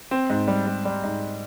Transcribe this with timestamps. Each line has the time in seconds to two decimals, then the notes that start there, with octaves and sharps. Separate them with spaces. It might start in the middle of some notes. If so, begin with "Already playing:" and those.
0.11 C4
0.30 G#2
0.48 G3
0.67 G3
0.85 G3
1.03 G#2